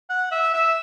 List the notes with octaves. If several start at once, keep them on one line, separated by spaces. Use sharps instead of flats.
F#5
E5
E5